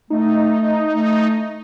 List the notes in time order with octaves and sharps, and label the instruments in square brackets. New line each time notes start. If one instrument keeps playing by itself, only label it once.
[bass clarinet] A3 [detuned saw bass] D#4
[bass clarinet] A3